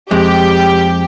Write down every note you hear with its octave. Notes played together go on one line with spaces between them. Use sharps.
F2 G#3 G4 G5